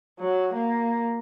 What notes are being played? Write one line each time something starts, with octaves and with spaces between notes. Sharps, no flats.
F#3
A#3